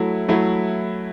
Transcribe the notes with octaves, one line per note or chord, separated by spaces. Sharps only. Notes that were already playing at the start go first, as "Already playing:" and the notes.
Already playing: F#3 A3 E4
F#3 A3 E4